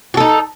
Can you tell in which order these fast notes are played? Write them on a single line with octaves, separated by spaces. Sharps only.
F#4 A4 D#4